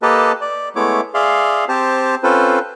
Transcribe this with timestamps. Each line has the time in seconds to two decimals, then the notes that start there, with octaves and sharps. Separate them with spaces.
0.02 A#3 G4 A4 B4 D#5 A5
0.41 D5
0.76 G#3 A3 B3 E4 C#5 D6
1.14 G#4 D5 E5 F5 C6
1.69 C4 G4 C5 A5
2.23 C4 C#4 F4 A4 B4 C5